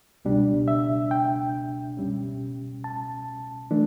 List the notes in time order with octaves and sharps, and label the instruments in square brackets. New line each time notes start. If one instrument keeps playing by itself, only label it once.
[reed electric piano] C#2 B2 G3 D4
E5
G5
C#2 B2 G3 C#4
A5
E3 A3 D4